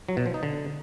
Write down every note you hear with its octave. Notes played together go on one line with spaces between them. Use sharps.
F#3
B2
F3
D#4
D3